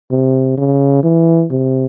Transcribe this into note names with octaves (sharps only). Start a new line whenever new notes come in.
C3
C#3
E3
C3